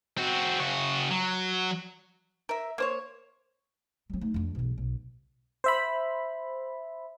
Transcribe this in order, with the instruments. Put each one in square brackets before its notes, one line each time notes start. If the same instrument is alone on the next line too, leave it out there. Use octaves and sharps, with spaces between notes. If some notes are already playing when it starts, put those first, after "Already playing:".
[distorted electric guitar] C4 F#4
C#3 F#4
F#3
[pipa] A#4 E5
A#3 C5 C#5
[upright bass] F#3 C4
A3 D#4
F2 D4
B1 E2
B1
[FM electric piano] C5 E5 B5